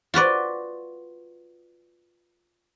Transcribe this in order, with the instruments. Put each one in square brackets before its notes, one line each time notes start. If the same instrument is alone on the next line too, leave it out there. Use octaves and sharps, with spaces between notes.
[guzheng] F4 F#4 B4 D5